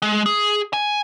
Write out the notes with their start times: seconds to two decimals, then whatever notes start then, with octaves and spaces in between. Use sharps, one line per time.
0.02 G#3
0.26 G#4
0.73 G#5